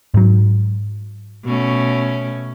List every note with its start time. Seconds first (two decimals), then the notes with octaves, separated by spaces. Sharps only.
0.14 G#2 F#3
1.45 B2 A3 C#4